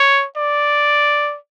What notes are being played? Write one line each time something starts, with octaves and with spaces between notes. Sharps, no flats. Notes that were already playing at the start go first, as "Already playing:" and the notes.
Already playing: C#5
D5